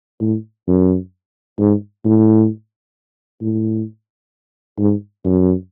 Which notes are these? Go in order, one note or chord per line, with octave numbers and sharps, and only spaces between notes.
A2
F#2
G#2
A2
A2
G#2
F#2